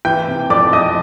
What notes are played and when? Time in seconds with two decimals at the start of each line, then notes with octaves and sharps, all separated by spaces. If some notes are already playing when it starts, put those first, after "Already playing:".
0.05 E3 G5 G6
0.28 C3
0.50 F2 D5 D6
0.73 F2 D#5 D#6